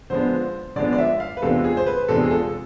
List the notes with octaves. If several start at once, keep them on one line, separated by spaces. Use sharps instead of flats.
D3 F3 G#3 B3 D4 C5
D3 F3 G#3 B3 D4 D5
D5
E5
F5
B4
E2 C3 G#3 D4 F4 A4
G#4
C5
B4
E2 C3 G#3 D4 F4 A4
G#4
A4